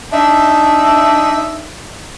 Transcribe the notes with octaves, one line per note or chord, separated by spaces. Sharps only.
D4 D#4 E5